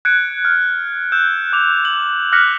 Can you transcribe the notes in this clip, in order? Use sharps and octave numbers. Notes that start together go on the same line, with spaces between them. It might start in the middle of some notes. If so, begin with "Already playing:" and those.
F#6 G#6 C#7 D7
F6
E6 F#6 G6 E7
D6 F7
F#7
D6 F6 F#6 A#6 B6 C#7